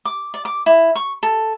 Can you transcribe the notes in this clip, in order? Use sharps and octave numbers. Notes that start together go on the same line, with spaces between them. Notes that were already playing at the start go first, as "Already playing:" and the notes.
D6
D5
D6
E4
C#6
A4